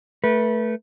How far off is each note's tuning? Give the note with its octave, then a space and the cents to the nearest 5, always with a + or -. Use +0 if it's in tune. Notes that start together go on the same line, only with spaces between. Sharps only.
A3 +0 B4 -25